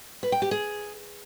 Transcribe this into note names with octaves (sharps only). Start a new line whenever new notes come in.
B4
G5
G4
G#4